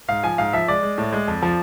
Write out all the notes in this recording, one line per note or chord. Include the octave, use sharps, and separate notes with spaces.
G#2 F5
F3 G#5
G#2 F5
F3 E5
G#3 D5
G#3
A2
G#3
F2
F3